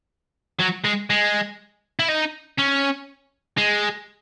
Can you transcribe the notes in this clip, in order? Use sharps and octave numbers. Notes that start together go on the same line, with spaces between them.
F#3
G#3
G#3
E4
D#4
C#4
G#3